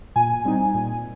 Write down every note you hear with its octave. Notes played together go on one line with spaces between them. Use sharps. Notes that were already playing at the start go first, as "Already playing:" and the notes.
A#2 G#5
G3 C4 D#4
A#2